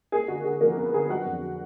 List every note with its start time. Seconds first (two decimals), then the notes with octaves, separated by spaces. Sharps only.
0.12 A#3 G#4
0.28 D3 F#4
0.44 D3 G#4
0.61 F3 A#3 A#4
0.77 A#3 B3 B4
0.94 D3 G#4
1.09 F#3 F#4 F#5
1.26 F2